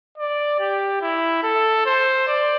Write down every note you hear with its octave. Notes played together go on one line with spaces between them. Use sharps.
D5
G4
E4
A4
C5
D5